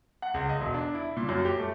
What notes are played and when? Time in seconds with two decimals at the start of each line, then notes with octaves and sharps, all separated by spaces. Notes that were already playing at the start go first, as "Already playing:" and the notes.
0.22 F#5
0.34 C#2
0.49 D#5
0.61 E1
0.74 D4
0.94 E4
1.17 A#2
1.29 F#2
1.45 G4
1.59 A3